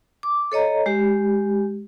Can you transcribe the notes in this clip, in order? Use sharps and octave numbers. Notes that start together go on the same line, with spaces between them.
D6
A4 C#5 D#5 A#5
G#3 G4